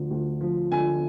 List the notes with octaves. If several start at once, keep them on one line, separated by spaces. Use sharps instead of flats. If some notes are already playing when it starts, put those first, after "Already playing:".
Already playing: D2 D3 F3
D2
F3
D3 G#5